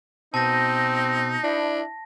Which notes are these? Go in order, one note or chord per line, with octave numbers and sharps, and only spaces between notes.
B2 C4 D#4 A5 A#6
D4 E4